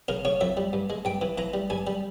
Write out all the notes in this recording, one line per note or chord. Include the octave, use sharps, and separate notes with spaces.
C#3 A#4
C#3 C#5
F2 E5
G3
G2
G#3
G2 G5
E3
E3 A#5
G3
G2 G#5
G3